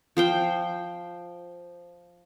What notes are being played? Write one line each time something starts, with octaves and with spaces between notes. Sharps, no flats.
F3 C5 G5